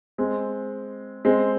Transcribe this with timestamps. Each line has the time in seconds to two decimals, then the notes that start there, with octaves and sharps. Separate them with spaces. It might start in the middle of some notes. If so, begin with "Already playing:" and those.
0.18 G#3 C4
1.25 G#3 C4